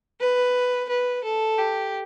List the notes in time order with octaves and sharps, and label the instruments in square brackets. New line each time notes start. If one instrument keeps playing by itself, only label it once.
[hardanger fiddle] B4
B4
A4
G4